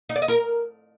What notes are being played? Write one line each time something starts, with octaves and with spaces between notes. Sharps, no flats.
D#4
D5
D#5
A#4